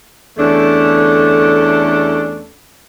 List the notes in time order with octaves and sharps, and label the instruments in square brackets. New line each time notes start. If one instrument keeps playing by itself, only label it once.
[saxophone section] E2 A3 C#4 D4 A4